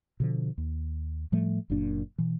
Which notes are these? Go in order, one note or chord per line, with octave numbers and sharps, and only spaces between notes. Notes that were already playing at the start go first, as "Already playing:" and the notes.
B2 D3 F3
D#2
A2 F3 G3 A3
F#1 F#2 A#2 D4
B2 E3